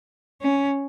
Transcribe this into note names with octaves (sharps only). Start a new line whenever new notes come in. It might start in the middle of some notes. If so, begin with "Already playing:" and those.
C#4